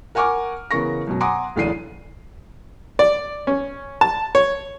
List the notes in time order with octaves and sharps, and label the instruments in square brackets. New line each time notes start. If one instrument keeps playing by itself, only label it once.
[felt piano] A#4 F#5 G#5 C#6 D6 F6
C#3 E3 B3 A#4 C#6 A#6
F#2 B2 F#3
F#5 G#5 A#5 C6 D6 D#6
F#1 D2 E3 D4 C7 D#7
[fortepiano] D5
C#4
A5
C#5